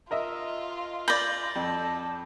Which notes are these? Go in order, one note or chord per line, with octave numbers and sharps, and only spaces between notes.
F4 A#4 D#5 E5
D5 B5 G6 A#6
F2 A4